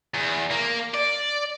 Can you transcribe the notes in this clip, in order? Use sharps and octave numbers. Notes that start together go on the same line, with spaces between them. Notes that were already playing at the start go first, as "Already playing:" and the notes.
E2
A#3
D5